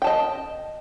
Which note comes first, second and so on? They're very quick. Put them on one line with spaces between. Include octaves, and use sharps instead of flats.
G5 A5 D#5